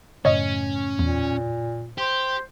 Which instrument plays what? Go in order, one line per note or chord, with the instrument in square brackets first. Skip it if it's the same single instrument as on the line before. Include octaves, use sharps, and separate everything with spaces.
[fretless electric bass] F#2 A2 C#3 [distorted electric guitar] C#4 [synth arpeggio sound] C#5 D#5
[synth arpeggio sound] E2 [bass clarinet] A#2
[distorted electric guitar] G4 [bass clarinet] C5